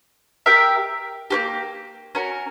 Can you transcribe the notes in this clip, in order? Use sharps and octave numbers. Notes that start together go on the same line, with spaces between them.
G4 A#4 E5
A#3 C#4 G4
C#4 F#4 A#4